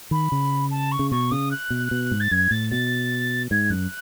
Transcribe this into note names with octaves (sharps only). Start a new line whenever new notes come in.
D#3 B5
C#3
A5
C#6
C#3
B2 C#6
C#3 D#6
F#6
B2
B2
G#2
A6
F#2 G#6
A2 A6
B2 A6
G#2 G#6
F#2 F#6